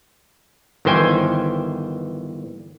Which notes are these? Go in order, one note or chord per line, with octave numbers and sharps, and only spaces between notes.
G1 D#3 E3 C5 G5 G#5